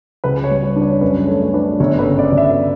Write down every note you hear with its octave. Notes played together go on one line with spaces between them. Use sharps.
C#2 B4
C#5
G3
C#5
D4
C#5
F#2 B4
A3 C#5
D4 B4
G1 C#5
B4
C#3
D5
G1
E5